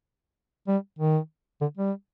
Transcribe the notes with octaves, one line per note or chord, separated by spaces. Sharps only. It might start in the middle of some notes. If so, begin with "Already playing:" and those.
G3
D#3
D3
G3